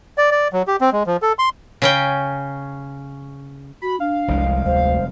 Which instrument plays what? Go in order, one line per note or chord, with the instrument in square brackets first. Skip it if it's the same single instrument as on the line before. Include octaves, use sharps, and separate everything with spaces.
[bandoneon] D5
D5
F#3
G4
C4
G#3
F3
A4
C6
[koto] C#3 C#4 G5
[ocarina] F#4 [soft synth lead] B5
[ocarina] D4 [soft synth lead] F5
[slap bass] F1 G3 G#3 [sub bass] C2
[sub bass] D2 [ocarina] C5